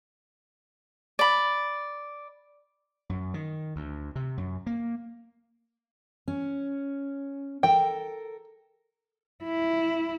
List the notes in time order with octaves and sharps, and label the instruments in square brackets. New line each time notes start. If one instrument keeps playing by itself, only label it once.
[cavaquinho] D5 B5
[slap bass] F#2
D#3
D2
C3
F#2
A#3
[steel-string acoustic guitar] C#4
[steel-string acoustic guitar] A4 A#4 [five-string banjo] G5
[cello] E4